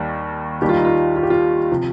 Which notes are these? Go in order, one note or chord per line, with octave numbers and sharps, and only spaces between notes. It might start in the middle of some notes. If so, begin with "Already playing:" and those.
Already playing: D#2 D#3 G3
D#2 D#3 G3 G4
F4
D#4
F4
F4
G4
F4
C3 F3